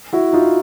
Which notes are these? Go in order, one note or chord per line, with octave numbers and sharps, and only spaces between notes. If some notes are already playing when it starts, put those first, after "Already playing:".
E4 F#4
D#4 F4